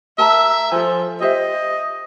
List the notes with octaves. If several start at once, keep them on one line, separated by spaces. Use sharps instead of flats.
A#4 E5 A5 A#5
F3 A4 G#5
G4 C5 D#5 E5